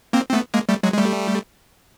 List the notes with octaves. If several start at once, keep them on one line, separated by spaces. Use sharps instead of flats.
A#3 C4
C4
A3 B3
G#3 A#3
G3 A3
F#3 G#3
G#3
G3 A3